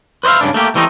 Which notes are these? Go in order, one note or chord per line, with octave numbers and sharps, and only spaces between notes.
B4 C5 D5 E5 F5
G2 C#3 D4
A3 A#3 G4
E3 G3 A3 C4 D#4